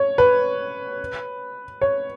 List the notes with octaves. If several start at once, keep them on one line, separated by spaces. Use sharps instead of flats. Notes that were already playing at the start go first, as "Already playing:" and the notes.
Already playing: C#5
B4
C#5